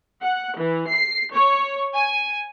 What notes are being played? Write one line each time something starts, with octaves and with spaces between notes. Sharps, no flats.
F#5
E3
C7
C#5
G#5